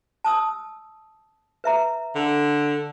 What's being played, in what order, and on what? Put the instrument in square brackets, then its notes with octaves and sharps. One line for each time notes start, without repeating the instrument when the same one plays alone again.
[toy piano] A5 D#6 E6
B4 E5 A#5
[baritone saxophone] D3